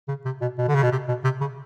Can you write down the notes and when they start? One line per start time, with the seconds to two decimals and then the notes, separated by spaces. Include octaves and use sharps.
0.08 C#3
0.25 C3
0.41 B2
0.58 B2
0.68 D3
0.75 C#3
0.83 B2
0.92 C3
1.09 B2
1.24 C3
1.41 C#3